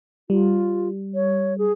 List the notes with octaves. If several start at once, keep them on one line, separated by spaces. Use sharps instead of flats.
G3 F4
C#5
G#4